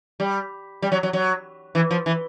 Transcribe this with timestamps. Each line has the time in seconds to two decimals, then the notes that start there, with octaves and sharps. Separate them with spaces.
0.20 G3
0.82 G3
0.92 F#3
1.03 F#3
1.13 F#3
1.75 E3
1.91 F3
2.06 E3